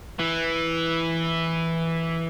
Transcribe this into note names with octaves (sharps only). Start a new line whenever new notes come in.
E3